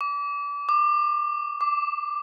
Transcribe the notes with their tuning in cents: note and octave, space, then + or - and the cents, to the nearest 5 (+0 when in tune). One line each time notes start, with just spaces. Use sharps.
D6 -30
D6 +30
D6 +0